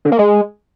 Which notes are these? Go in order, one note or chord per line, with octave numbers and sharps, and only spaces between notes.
D3
A#3
G#3